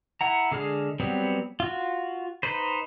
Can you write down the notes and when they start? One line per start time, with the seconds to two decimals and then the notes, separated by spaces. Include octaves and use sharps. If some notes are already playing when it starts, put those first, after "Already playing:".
0.21 E4 F#5 A#5
0.52 D3 G#3 G#4 F6
1.00 F#3 G3 B3 C4
1.60 F4 F#4
2.43 D#4 B4 C5